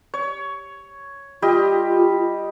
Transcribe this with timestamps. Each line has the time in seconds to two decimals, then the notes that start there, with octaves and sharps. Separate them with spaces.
0.14 C#5
1.42 G3 F4 G4 D#5